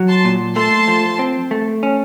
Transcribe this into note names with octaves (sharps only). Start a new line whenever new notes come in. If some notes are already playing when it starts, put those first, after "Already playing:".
Already playing: F#3
A5 C6
A#2
A3 A5 C6
F3
C4
A3
C#4